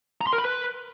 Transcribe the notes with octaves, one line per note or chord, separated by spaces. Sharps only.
A#5
C6
A#4
B5
B4